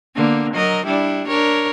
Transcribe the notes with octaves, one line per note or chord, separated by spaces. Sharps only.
D3 A#3 B3
F#3 A#4 D#5
G3 D4 E4
D4 A#4 C#5